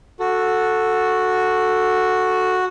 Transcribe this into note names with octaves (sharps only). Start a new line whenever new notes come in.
F#4 A4